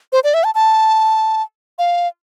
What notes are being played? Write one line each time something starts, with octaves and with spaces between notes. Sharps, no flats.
C5
D5
E5
A5
A5
F5